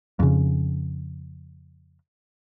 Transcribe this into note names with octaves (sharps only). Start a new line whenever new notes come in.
F2 C#3